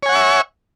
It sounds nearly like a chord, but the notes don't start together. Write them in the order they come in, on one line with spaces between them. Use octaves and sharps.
C#5 G#5 F#5 C#6 E5